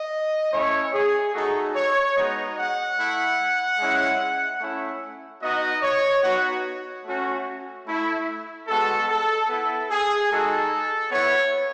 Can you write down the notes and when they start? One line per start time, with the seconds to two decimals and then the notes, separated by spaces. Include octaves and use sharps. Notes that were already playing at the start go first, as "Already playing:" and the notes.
Already playing: D#5
0.52 A3 C#4 E4 C#5
0.93 G#4
1.34 A3 D#4 F#4 A4
1.74 C#5
2.15 G#3 B3 D#4 F#4 D#5
2.55 F#5
2.96 A3 E4
3.78 G#3 C#4 E4
4.59 A3 C#4 E4
5.41 B3 D#4 F#4 D#5
5.81 C#5
6.22 B3 D#4 F#4
7.04 A3 C#4 F#4
7.86 A3 E4
8.67 G#3 B3 F#4 A4
9.08 A4
9.48 B3 E4 A4
9.89 G#4
10.30 G#3 D#4 F#4 A4
11.11 B3 E4 C#5